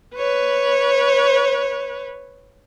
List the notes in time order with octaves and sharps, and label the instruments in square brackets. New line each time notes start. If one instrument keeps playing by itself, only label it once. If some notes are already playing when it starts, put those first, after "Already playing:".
[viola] B4 C#5